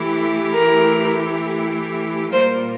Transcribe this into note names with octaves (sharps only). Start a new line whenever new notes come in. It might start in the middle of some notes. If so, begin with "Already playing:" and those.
Already playing: E3 A3 E4 G4
A#4
A#2 G3 A#3 F4 A#4 C5